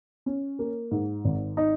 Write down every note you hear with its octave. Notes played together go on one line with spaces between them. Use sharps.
C#4
A#3
G#2
G#1
D#4